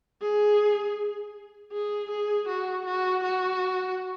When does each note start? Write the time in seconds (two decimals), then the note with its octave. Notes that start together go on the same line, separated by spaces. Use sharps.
0.22 G#4
1.72 G#4
2.10 G#4
2.48 F#4
2.85 F#4
3.23 F#4